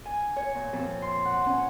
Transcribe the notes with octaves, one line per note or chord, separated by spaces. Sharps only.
G#5
C#5
A#2
F2
C6
F#5
C#4